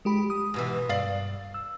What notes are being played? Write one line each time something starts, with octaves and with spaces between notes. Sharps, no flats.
G#3 G4 B5
D#6
G#2 B2 E3
G2 D5 F5
E6